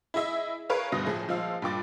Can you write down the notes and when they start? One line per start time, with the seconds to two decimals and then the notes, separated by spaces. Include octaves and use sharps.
0.14 E4 G#4 D#5 E5
0.69 G#4 A#4 B4 C#5 F5
0.92 D2 G2 B2 D#6 A#6
1.06 A2 F3 G#4
1.28 A#2 F3 G#3 F5 E6
1.62 G2 A#2 G5 D6 A6